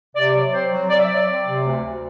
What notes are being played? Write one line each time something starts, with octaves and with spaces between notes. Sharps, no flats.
C3 D5
F#3
C4 C5
F#3
F#3 D5
E5
F#3 D5
C4
C3
D2
D2